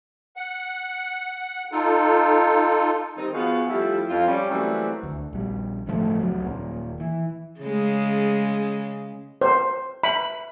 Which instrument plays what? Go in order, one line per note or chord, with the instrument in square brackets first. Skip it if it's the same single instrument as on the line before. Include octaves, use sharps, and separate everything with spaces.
[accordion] F#5
D#4 F4 A4
[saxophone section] D#3 G3 C4 D#4
F3 B3 F#4 G#4 F5
F3 G3 A3 E4
F2 F3 F4
G3 C#4
E3 F#3 G3 A3 A#3 C4
[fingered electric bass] D2
A#1 G3
G1 A2 F3 A3
C#2 F#3
D#1 A#2
E3
[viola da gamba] C#3 G#3
[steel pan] C5
B5